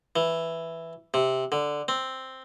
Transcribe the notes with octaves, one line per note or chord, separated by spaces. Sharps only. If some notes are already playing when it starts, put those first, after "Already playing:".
E3
C3
D3
C4